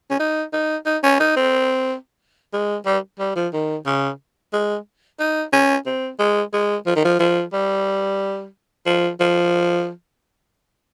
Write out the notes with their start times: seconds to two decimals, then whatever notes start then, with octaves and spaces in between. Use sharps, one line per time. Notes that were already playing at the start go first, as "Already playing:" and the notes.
0.11 C#4
0.20 D#4
0.53 D#4
0.86 D#4
1.03 C#4
1.20 D#4
1.37 C4
2.53 G#3
2.86 G3
3.20 G3
3.36 F3
3.53 D#3
3.86 C#3
4.53 G#3
5.19 D#4
5.53 C#4
5.86 C4
6.19 G#3
6.53 G#3
6.86 F3
6.96 D#3
7.05 F3
7.19 F3
7.53 G3
8.86 F3
9.20 F3